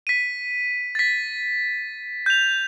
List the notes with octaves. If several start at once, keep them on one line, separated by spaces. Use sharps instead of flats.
B6 D#7
A6 B6
G6 F7